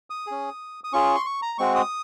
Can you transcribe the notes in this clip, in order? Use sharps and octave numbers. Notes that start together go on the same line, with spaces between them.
D#6
C#4 G#4
D#6
C#4 F4 G#4 C#6
C6
C#6
A#5
G#3 C4 F#4 C#6
D#6